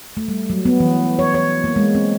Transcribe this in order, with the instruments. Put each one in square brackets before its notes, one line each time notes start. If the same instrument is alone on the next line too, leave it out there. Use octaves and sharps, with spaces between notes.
[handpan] A3
G3
F#3
B3
E3
C#5
C#5
A#3
G#3
C4